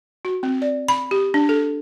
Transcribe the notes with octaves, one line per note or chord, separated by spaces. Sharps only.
F#4
C4
D5
B5
G4
D4
A4